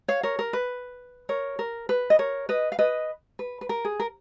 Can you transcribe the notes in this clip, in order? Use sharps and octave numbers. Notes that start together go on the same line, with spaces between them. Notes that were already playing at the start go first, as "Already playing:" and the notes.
C#5 F5
A#4 C#5
A#4
B4
A#4 C#5
A#4
B4
D#5
A#4 C#5
B4 D#5
F5
B4 D#5
B4
B4
A#4
G#4
A#4